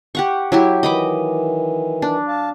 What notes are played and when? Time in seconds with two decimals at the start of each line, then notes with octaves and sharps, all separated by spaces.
0.15 G4 F#5 C#6
0.52 F#3 E4 G4
0.83 D#3 E3 D#5 B5 D6
2.02 D4
2.28 F5 A5